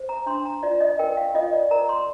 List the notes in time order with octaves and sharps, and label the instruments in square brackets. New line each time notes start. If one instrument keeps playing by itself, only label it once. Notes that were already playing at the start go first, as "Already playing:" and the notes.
Already playing: [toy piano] C5
A#5
D4 C6
A#5
F4 D5
D#5
A#4 G5
F5
F4 D#5
D5
A#4 A#5
C6